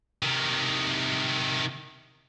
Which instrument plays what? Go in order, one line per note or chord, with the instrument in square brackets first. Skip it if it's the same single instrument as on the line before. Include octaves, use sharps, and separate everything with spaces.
[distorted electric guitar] C3 D#3